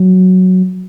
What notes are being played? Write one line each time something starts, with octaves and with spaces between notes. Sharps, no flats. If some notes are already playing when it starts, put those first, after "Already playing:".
Already playing: F#3